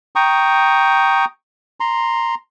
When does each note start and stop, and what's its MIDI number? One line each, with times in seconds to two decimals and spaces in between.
0.16 1.25 79
0.16 1.25 82
0.16 1.25 85
0.16 1.25 87
1.80 2.35 82
1.80 2.35 84